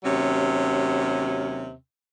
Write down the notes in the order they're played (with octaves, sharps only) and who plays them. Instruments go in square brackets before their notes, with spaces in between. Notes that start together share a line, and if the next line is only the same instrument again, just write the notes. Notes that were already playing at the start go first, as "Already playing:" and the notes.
[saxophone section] D#2 C3 F#3 C#4